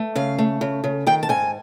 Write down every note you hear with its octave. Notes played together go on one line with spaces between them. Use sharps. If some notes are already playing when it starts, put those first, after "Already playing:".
Already playing: A3
C#3 F5
A3
C#3
C#3
D#3 G5
A5
G#2 G#5